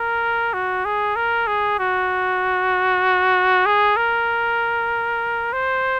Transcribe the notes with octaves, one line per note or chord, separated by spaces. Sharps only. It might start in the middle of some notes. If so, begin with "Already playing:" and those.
Already playing: A#4
F#4
G#4
A#4
G#4
F#4
G#4
A#4
C5